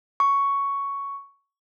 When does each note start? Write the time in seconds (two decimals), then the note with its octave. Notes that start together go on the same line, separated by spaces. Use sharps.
0.20 C#6